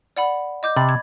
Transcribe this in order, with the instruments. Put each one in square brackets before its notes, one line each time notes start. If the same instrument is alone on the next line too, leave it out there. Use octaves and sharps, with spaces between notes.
[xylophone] D5 F#5 B5
D#5 D6 G6
[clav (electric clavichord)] C3 [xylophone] B5 A6
[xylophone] G#6